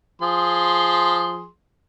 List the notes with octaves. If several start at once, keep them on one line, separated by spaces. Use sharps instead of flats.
F3 G#4 C6